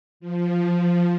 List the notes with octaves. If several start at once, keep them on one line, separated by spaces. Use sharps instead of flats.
F3